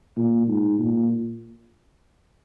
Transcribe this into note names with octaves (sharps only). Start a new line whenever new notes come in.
A#2
G#2
A#2